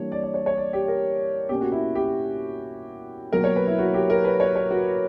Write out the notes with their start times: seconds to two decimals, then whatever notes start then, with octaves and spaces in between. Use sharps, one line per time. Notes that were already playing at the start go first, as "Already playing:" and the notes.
Already playing: E3 G3 A#3 D4 C#5
0.12 D5
0.23 D5
0.34 C#5
0.46 C#5
0.57 D5
0.73 G4
0.88 A#4
1.49 B2 A#3 C#4 G4
1.61 F#4
1.72 E4
1.95 G4
3.33 B2 F#3 A#3 A#4
3.44 C#5
3.56 B4
3.67 E4
3.78 F#4
3.94 G4
4.10 A#4
4.25 B4
4.40 C#5
4.56 C#5
4.71 F#4